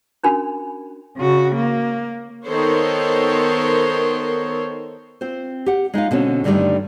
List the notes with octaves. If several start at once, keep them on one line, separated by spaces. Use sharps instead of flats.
C#4 D4 F#4 A#4 G#5 B5
C#3 F#4
A#3
D#3 B3 A4 C5 C#5
C4 F4 C5
G4 F#5
G#3 D#4 F4 F5
B2 D3 C4 C#4
G2 D3 D#3 F3 G3 A3